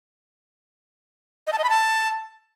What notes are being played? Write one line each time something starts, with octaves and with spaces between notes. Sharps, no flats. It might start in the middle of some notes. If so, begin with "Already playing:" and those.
D#5
A5
D#5
B5
A5